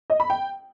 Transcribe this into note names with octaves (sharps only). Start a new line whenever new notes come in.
D#5
B5
G5